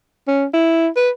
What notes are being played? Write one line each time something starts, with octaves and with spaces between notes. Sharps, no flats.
C#4
E4
B4